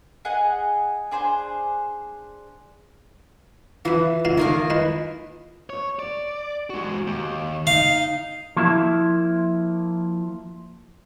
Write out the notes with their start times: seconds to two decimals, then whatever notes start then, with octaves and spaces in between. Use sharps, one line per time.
0.25 G#4 D#5 F#5 G#5
1.11 D4 G#4 C5
3.85 E3 F3 B4
4.25 C#2 E4 F5
4.38 A1 D#3 A#3 F4
4.70 G#3 E4 B4
5.70 C#5
5.99 D5
6.70 G#3 F#4
7.07 D#2
7.67 D#4 F5
8.56 F3 A#3 E4 E5